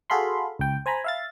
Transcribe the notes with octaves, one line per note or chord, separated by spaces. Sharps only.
F#4 G#4 A4 F5 B5 C6
C#2 G5
C5 G#5 A#5 B5
E5 F5 A6